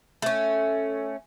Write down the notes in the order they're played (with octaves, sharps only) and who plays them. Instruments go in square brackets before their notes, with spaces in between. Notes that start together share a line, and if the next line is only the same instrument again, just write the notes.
[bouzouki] A3 C#4